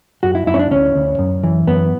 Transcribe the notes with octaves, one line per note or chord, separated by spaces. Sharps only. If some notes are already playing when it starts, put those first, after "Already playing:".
F#2 F#4
E4
F#2 E4
C#4
D4
D2 C#4
D2
F#2
E3
F#2 B3